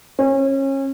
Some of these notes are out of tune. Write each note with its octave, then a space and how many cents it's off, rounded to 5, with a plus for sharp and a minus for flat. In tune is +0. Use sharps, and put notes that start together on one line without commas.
C#4 -30